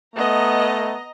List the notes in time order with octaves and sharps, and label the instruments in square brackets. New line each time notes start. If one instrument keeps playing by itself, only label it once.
[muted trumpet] A3 [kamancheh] B3 [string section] D#5 A#5